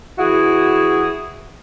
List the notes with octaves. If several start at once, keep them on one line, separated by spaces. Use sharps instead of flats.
E3 E4 F#4 G#4